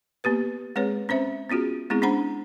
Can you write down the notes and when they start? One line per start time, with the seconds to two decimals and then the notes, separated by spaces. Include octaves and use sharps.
0.24 A#3 B3 G4 B4
0.76 G#3 C4 G#4 B4 C#5
1.09 C4 C#4 C5 E5
1.50 B3 C#4 F4 F#4 G#4
1.90 G#3 B3 C4 E4 G#4
2.02 C#4 D4 C5 F#5 A#5 B5